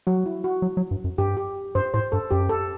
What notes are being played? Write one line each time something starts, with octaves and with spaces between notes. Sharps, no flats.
F#3 F#4
E4
F#4
F#3
F#3
G2
F#2
G2 G4
G4
G2 C5
A2 C5
G2 A4
F#2 G4
A4